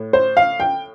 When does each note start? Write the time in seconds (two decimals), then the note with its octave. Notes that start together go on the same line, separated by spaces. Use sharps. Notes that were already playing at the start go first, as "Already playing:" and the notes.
Already playing: A2
0.13 C5
0.37 F5
0.60 G5